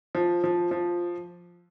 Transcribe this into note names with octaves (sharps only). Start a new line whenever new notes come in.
F3
F3
F3